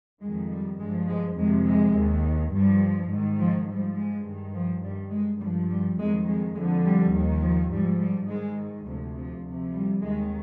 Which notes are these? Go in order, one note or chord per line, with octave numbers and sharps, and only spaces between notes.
F2 D#3 G#3
G3
G2 F3 G#3
G#3
F2 C3 D#3 G#3
G#3
D#2 D#3
G2 F3 G3
G#2
D#3
F3
G#2 F3 G3
G#3
G2 D#3
F3
G2 D#3 G3
G#3
G2 F3 G3
G3
F2 D#3 G#3
G#3
F2 D3 F3 G#3
G3
D#2 D#3
F3
G#2 F3 G3
G3
G#2 D#3 G#3
D2 C3 F3 G3
F3
D2 C3 F3
G3
D#2 D#3 G#3